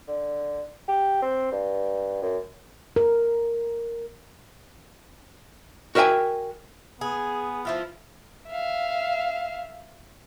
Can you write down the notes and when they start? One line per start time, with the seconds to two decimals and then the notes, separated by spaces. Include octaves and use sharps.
0.08 D3
0.88 G4
1.22 C4
1.52 G2
2.22 F#2
2.96 A#4
5.95 F#4 A#4 E5 G5 G#5
7.01 B3 G#4
7.65 F3 E4 F4
8.49 E5 F5